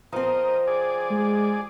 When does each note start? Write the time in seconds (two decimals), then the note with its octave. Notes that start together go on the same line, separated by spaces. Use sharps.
0.13 F3 C4 A#4 D#5
0.67 G#4 D5
1.10 G#3